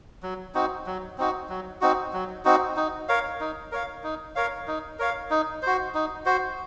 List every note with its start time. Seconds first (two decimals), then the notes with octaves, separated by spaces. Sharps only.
0.23 F#3
0.55 C4 D#4 F#4
0.86 F#3
1.18 C4 D#4 F#4
1.49 F#3
1.81 C4 D#4 F#4
2.13 F#3
2.45 C4 D#4 F#4
2.77 D#4
3.08 A#4 C#5 F5
3.40 D#4
3.72 A#4 C#5 F5
4.04 D#4
4.35 A#4 C#5 F5
4.68 D#4
4.99 A#4 C#5 F5
5.30 D#4
5.63 F#4 C5
5.94 D#4
6.26 F#4 C5